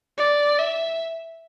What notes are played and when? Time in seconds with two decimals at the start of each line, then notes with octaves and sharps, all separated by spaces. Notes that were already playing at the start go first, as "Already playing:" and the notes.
0.18 D5
0.59 E5